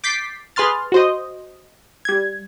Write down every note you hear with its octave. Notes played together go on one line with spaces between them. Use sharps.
D6 G6 A6 B6 C7
G#4 B4 C6 F6 A6
F#4 C5 D#5
G3 G#6